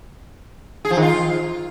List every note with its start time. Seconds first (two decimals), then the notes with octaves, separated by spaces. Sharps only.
0.85 G#4
0.91 F3
0.97 D#3
1.03 F4